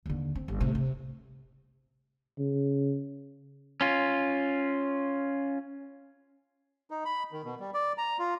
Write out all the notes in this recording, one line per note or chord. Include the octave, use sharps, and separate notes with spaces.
D#2 D3
C4
G1
A2 C3
C3
C#3
C#4 F4
D#4
B5
D#3
B2
G3
D5
A#5
F4